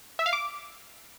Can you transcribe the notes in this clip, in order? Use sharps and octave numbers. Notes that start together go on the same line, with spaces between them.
E5
F5
D6